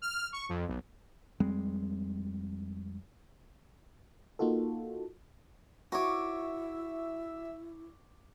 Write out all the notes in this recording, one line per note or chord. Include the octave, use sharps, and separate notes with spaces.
F6
C#6
F2
B1
F2 G3 G#3 C4
A#3 D#4 F4 F#4 A4
E4 F#4 C#5 E5 C#6 D6